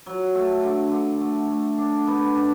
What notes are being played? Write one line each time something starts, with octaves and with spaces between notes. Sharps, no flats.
F#3
A3
D3
D3
A3
A3
D4
B3
D4